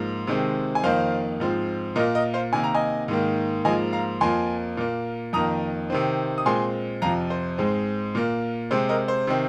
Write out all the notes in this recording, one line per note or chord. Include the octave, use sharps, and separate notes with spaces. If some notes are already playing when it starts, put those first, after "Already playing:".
Already playing: G#2 F3 A#3
C3 D#3 G#3 C4
G#5
F2 D#3 A#3 C5 F5
G#2 F3 C4
A#2 A#3 A#4 D#5
A#4 D#5
C5 F5
C3 D#3 A#3 G#5
A#5
D#5 G#5
G#2 D#3 A#3
G#2 F3 A#3 D#5 G#5
F5 A#5
F2 F3 A#3 G#5 C6
A#2 A#3
F2 D#3 A#3 A#5 D#6
C3 D#3 C4
D#6
A#2 G#3 C4 G#5 C6
F2 C3 F3 F5 A#5
C5
G#2 G#3 C4
A#2 A#3
C3 G#3 C4 C5
A#4 D#5
C5
C3 D#3 C4